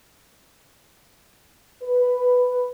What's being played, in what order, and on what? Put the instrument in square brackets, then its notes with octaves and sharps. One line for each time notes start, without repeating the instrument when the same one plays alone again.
[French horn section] B4